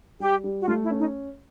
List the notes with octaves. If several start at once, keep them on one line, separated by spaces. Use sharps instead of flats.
G3 G4
G3
F#4
A3 F4
E4
C#4
D#4